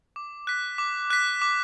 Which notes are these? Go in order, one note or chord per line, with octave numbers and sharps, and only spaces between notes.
D6
F#6 B6
D6
F#6 B6
D6